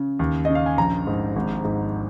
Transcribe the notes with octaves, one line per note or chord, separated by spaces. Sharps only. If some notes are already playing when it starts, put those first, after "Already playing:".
Already playing: C#3
D#2
C#3 D#5
F5
G#5
A#1 A#5
G#2
G#1
G#2